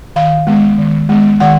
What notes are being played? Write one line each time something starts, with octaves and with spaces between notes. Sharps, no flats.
D#3 F5
G#3 B3
D#3
G#3 B3
D#3 F#5